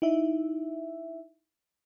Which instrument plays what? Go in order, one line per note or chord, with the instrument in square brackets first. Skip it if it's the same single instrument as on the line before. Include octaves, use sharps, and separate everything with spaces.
[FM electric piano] D#4 E4 E5